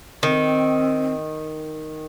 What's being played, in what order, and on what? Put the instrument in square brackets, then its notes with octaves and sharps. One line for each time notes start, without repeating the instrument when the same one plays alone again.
[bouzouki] D#3 [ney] C4